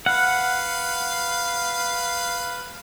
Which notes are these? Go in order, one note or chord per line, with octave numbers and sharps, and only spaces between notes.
B4 F5 F#5